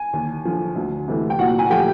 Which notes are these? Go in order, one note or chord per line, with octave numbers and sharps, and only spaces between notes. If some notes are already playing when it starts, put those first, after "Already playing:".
Already playing: G#5
D#2
D3 F3
D2
C3 E3 A3
G5
A#2 F#4 F#5
G#5
F3 A3 G4 G5